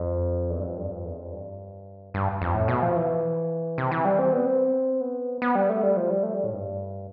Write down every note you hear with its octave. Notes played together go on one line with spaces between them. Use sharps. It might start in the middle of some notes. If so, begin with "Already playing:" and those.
Already playing: F2
E2
G2
F2
G2
F2
E2
F2
G2
G2
F2
A2
B2
F3
E3
C3
E3
G3
C4
B3
C4
B3
B3
G3
A3
G3
F3
G3
A3
G3
A2
G2